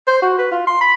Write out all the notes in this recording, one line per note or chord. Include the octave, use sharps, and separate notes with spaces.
C5
F#4
B4
F4
C6
B5